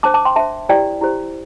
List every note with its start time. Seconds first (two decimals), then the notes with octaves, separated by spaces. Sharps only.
0.03 D4 C5 A5 D6
0.14 A5 D6
0.25 G5 C6
0.36 D4 C5 E5 A5
0.69 E4 G4 C5 D5 G5
1.01 E4 G4 C5